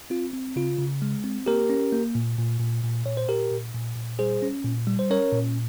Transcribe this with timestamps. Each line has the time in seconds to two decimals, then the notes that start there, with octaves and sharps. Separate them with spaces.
0.10 C4 F4
0.33 C4
0.56 C#3 F4
0.79 C#3
1.02 G#3
1.24 C4
1.46 A#3 G4 A#4
1.70 C#4
1.92 A#3
2.15 A#2
2.38 A#2
2.60 A#2
2.83 A#2
3.06 A#2 C#5
3.17 C5
3.28 A#2 G4 A#4
3.52 A#2
3.74 A#2
3.96 A#2
4.19 G3 G#4 C5
4.42 C#4
4.65 A#2
4.87 G3
4.99 C5
5.10 C#4 A#4 C#5
5.32 A#2